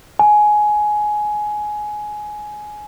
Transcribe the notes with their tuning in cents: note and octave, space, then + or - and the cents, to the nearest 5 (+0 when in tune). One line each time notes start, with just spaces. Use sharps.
G#5 +15